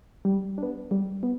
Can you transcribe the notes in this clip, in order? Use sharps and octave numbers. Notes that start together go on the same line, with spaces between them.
G3
B3 D4
G3
B3